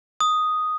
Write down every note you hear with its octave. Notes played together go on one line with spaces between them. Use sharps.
D#6